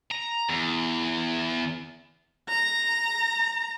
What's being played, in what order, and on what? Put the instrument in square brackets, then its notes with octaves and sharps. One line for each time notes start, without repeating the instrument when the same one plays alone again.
[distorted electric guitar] A#5
E2
[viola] A#5